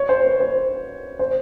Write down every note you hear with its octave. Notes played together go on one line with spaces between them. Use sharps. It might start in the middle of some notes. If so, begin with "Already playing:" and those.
Already playing: C#5
C5
B4
C5
C5